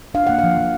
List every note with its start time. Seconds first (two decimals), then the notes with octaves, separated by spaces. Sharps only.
0.14 D4 F5
0.27 A#3 F#5
0.38 F3 F5
0.57 F3